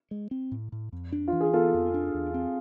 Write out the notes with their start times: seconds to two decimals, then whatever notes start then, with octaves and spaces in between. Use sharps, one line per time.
0.11 G#3
0.31 C4
0.52 A2
0.72 A2
0.93 F2
1.12 D4
1.28 E3 F4
1.40 G#4
1.53 B3 F4 A4
1.74 F2
1.94 D4
2.14 E2
2.34 C4